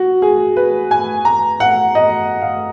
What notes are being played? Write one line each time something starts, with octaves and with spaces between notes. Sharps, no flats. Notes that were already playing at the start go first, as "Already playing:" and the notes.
Already playing: F#4
G#4
B4
G#5
A#5
F#5
D#5
F5